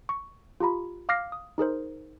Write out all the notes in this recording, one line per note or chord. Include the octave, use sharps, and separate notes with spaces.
C#6
F4 G4 A#5 B5
F5 D6 F6 A#6 C7
D#6
D#4 G#4 A#4 C5